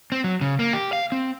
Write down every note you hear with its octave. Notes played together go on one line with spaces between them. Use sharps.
C4
F#3
C#3
A#3
G4
F5
C4